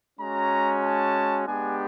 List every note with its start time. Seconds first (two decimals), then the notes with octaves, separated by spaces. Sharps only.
0.19 G#3 C#4 F#4 A#5
0.83 A5
1.47 G#3 B3 D4 G4 G#5